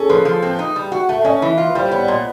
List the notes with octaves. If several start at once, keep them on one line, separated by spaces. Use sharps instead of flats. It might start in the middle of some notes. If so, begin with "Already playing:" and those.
Already playing: C#4 G#4 A4
F3 B4
F3
C4
D#4
G3
F#4
A3
C#4 D#5
E3
F4
B4
G3 C5
B3 C#5
D5
A#2 D#5